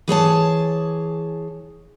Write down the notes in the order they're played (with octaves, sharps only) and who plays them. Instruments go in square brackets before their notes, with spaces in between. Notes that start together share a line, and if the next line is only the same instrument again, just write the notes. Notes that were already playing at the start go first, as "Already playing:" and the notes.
[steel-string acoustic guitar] E3 G#4 C#5 A5